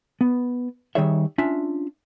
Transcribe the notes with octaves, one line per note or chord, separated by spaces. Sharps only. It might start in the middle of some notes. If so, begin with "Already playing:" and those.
B3
D#3 G3 D#4 G#4 C#5 E5
C#4 D4 F4 E5